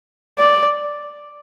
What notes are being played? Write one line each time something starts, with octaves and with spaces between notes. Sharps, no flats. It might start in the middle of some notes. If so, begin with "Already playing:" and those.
D5